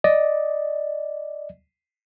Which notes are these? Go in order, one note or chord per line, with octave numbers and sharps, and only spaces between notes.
D5 D#5